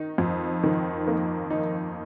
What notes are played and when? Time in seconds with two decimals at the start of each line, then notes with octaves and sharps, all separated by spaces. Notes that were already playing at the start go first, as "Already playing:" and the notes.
Already playing: D#3 D#4
0.18 F2
0.64 D#3
1.07 A#3
1.50 D#4